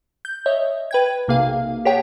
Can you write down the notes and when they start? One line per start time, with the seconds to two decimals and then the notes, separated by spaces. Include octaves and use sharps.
0.25 G6
0.46 C#5 D#5 E5
0.91 B4 G5 G#6
1.28 B1 C3 A#3 G#4 F5
1.85 G4 G#4 C#5 F#5 G5 A5